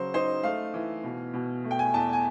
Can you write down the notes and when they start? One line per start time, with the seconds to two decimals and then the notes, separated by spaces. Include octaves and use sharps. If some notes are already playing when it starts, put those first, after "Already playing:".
Already playing: C#3 F#3 C5
0.14 D#4 C5
0.43 A3 F5
0.74 E3
1.04 B2
1.33 B2
1.64 A3
1.71 G5
1.79 G#5
1.94 E2 A5
2.13 G#5